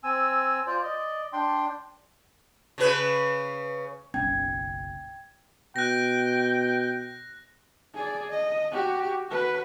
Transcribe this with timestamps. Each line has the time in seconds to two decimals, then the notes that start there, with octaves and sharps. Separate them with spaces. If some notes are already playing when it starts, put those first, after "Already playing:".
0.04 C4 G#5 E6
0.67 F4 C5 D5
0.83 D5 D#5
1.33 D4 G5 C6
2.78 C#3 C#4 B4
4.14 F#1 B1 C#4 G5 G#6
5.76 B2 G5 F#6 A#6
7.94 G#4 D5
8.30 D#5
8.72 F#4 G4
9.27 F#4 B4